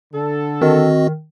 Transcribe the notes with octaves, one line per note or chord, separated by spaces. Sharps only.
D3 A4
D#3 C4 F#4 D#5